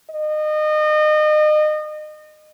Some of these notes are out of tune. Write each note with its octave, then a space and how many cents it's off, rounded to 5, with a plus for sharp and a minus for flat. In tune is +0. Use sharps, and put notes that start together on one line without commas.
D#5 -30